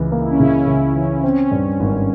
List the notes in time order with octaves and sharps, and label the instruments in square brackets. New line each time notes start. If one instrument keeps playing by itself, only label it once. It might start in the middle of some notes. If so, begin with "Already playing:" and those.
Already playing: [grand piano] C#2 E3
A#3
[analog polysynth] E4
C#4
[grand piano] C#3 [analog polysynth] E4
[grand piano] C#2
E3
[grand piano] C4 [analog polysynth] C#4
[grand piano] G2
G#1